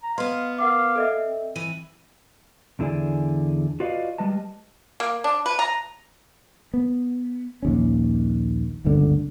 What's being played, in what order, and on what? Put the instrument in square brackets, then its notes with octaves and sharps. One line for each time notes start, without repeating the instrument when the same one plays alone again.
[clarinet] A#5
[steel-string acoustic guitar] B3 B4 [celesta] D#5 C6 [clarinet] F5
[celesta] A#4 F#5 D6 [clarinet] F5
[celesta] A4 D#5 E5
[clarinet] C4
[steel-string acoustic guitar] E3 [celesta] D#7
[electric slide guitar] E2 D3 E4 G#4 D5 G#5
F4 F#4 B4 D5 D#5 F5
G3 G#3 B4 D#5 A5
[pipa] A#3
D4
B4
A#5
[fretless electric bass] B3
A#1 D#2 C#4
D1 G1 C#2 D3